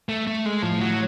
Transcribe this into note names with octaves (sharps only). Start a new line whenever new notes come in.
A3
A3
G#3
A2 F3
F#3